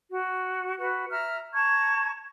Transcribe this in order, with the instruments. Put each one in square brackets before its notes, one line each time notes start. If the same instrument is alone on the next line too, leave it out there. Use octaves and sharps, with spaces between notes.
[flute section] F#4
F#4 B4
E5 A#5 F6
A5 A#5 C#6 G#6